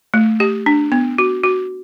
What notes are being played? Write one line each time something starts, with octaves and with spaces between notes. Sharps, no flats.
A3
G4
D4
B3
F#4
F#4